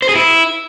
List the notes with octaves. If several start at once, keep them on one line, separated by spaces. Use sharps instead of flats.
C5
G#4
E4